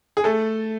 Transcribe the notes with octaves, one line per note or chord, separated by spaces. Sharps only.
G#4
A3 A4